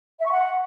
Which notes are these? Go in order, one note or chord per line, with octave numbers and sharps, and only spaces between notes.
E5
C#6
F#5